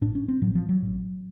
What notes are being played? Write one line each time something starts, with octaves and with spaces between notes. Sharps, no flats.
A1 A2 D4
C#4
C4
A1 A2 F#3
F3
F#3
A1 A2